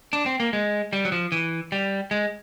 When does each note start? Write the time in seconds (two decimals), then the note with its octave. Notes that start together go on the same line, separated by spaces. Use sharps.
0.13 D4
0.26 C4
0.40 A#3
0.53 G#3
0.93 G3
1.05 F#3
1.12 F3
1.32 E3
1.72 G3
2.11 G#3